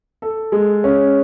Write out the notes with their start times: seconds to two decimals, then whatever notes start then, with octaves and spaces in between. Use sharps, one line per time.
0.22 A4
0.52 G#3
0.84 C#4